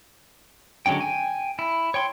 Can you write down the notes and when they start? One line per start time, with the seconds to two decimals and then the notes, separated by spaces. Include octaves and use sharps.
0.86 D3 F#3 G#3 C#4 G5
1.01 G5 G#5
1.59 E4
1.94 C#5 G5 C6